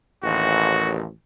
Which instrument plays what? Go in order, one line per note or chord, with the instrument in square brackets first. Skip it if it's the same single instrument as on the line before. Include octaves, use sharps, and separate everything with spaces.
[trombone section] A1 D#2 [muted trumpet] F#4